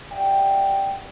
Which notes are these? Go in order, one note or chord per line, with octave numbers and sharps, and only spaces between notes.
G4 D5 E5 F#5 G5